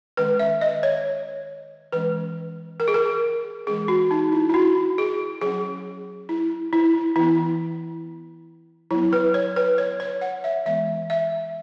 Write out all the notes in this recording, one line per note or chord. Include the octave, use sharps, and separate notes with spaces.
D#3 G#3 C#4 B4
E5
D#5
C#5
E3 G#3 C#4 B4
A#4
G#4
A#4
E3 G#3 C#4 G#4
F#4
D#4
E4
E4
F#4
G#4
F#3 C#4 G#4
E4
E4
E3 B3 E4
F#3 B3 E4
B4
C#5
B4
C#5
C#5
F#5
E5
E3 G#3 B3 E5
E5